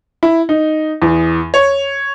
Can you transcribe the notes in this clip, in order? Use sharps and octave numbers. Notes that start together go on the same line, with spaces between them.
E4
D#4
E2
C#5